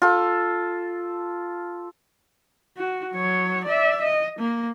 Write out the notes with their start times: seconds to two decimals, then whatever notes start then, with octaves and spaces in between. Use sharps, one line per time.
0.02 F4 A4
2.77 F#4
3.13 F#3 C#5
3.64 D5 E5
4.01 D#5
4.39 A#3